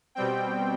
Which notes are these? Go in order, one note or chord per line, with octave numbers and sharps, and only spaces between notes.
B2 G3 C4 G5